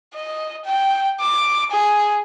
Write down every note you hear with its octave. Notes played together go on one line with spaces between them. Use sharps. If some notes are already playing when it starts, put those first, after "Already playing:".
D#5
G5
D6
G#4